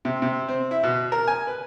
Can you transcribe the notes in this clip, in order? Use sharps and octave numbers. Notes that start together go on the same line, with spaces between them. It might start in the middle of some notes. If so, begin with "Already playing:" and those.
C3
C3
C4
E4
B2
A#4
G#5
B4